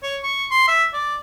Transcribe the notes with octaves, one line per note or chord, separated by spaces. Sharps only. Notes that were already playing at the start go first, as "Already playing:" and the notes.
C#5
C#6
C6
E5
D5